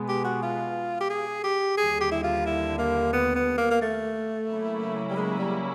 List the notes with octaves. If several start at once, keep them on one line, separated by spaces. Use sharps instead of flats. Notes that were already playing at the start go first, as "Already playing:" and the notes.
Already playing: B2 G#3 B3
G4
F#4
F4
G4
G#4
G4
D#2 D3 G3 G#4
G4
E4
F4
E4
A#3
B3
B3
A#3
A#3
A3
C#3 F#3 A#3 C#4 E4
G3
G#3
G3